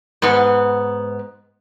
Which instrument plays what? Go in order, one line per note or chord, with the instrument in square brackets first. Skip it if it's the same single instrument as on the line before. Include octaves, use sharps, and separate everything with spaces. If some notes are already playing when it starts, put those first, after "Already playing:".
[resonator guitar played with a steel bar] G#2 B3